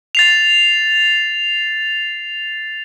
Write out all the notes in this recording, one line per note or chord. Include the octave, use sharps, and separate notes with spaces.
A6 C7 F7